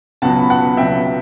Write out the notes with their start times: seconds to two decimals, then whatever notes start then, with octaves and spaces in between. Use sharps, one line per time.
0.22 C#2 B2 F#3 F#5 A5
0.40 B5
0.50 F#5 A5
0.77 C#2 B2 F#3 E5 G5